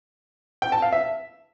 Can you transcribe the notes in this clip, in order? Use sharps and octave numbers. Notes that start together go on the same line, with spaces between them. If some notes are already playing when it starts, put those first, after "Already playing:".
G5
A5
F5
E5